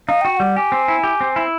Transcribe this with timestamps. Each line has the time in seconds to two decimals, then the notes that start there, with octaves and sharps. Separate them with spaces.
0.08 D#4 F5
0.21 F#4 G5
0.32 G5
0.37 G3 F#5
0.56 G4 G#5
0.72 C4
0.88 E4
1.04 G4
1.21 C4
1.36 E4